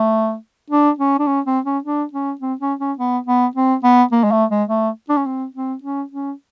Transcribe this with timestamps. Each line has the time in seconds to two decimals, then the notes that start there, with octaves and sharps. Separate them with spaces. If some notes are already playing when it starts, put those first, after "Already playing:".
Already playing: A3
0.70 D4
0.98 C#4
1.19 D4
1.27 C#4
1.46 C4
1.65 C#4
1.84 D4
2.13 C#4
2.41 C4
2.60 C#4
2.79 C#4
2.98 B3
3.26 B3
3.55 C4
3.83 B3
4.12 A#3
4.24 G#3
4.32 A3
4.50 G#3
4.69 A3
5.09 D4
5.17 C#4
5.26 C4
5.55 C4
5.83 C#4
6.12 C#4